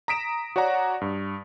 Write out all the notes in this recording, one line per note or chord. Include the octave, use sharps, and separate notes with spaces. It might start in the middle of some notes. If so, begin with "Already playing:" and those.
A#5 D#6 B6 D7 E7
F#4 C#5 D5 F#5 A#5
G2